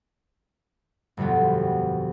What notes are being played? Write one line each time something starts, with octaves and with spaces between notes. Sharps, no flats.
G1 F2 B2 G3 B3